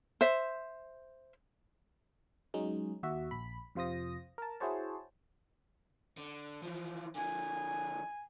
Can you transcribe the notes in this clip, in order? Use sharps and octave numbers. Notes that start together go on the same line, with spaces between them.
C5 E5
F#3 G#3 C#4 D#4
D#2 F#4 E5
A#1 B5
F2 C3 F4 C5 D#6 A#6
A#4 A5
E4 F#4 G#4 C5 C#5 A5
D3
E3 F3
D3 F3 G#5